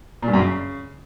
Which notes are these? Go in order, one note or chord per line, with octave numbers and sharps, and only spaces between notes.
A#2
G2
F#2
C#3